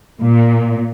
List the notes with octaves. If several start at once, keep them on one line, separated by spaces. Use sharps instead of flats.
A#2